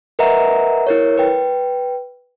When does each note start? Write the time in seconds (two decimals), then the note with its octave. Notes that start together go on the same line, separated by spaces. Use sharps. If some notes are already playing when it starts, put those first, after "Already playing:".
0.19 A#4 B4 D#5 E5 F#5 A#5
0.87 E4 A#4 C#5
1.18 B4 G5